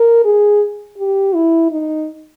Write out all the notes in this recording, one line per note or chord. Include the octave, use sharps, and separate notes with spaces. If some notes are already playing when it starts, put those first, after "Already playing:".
Already playing: A#4
G#4
G4
E4
D#4